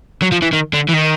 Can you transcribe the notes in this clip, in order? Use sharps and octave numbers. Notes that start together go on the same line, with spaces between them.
F#3
F3
E3
D#3
D3
E3
D#3